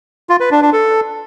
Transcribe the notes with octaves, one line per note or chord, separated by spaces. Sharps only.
F4
B4
D4
D4
A4